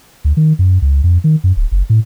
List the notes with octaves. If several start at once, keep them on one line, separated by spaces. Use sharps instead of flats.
D2
D#3
F#2
C#2
F2
D#3
F#2
D1
F#1
A2